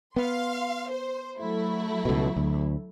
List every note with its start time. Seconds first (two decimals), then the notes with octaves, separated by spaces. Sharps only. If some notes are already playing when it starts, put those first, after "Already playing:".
0.16 B3 F5 C6
0.89 C5
1.38 F#3 A3 E4
2.05 C#2 B2
2.36 D2